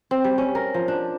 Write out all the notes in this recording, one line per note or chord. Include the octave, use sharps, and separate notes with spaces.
C4
G3
C#4
A#4
F3
D4